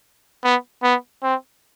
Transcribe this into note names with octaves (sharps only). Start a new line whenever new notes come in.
B3
B3
C4